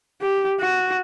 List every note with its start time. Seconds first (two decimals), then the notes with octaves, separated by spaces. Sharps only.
0.21 G4
0.60 F#4